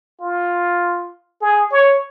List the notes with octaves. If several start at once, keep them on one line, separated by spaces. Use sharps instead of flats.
F4
G#4
C#5